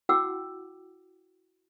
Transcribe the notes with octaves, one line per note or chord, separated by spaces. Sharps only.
E4 F#4 F#5 G5 D6 E6